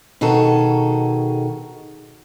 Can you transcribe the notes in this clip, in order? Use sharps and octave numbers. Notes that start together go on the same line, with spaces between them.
B2 D#3 F#4 G#4 A4